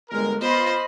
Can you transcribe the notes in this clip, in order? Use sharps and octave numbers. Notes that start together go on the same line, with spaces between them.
G1 G#3 A#4
B3 F4 C5 D#5 B5 C6